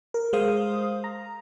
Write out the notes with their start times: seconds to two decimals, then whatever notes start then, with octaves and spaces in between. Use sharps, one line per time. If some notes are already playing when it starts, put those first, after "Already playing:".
0.14 A#4
0.33 G#3 C5 F5 D#6
1.04 A#5